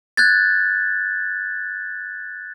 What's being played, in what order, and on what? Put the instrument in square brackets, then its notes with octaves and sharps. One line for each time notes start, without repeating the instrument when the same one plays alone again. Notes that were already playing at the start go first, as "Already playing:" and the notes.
[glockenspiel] F#6 G#6 A6